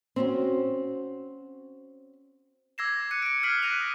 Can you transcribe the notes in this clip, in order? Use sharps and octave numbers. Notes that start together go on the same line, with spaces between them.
C4 C#4 F#4
D6 E6 G#6 A#6 C7 E7
F#6 C#7 D#7
C#7 D7
F6 G#6 B6 C7 F#7
F6 F#6 A#6 D7 D#7 F7
D#6